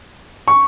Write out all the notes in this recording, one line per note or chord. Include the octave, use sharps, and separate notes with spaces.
C#6